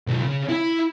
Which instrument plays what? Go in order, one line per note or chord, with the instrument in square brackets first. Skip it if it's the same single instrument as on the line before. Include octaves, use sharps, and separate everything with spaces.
[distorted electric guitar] B1 D#3
C#3
E4 E5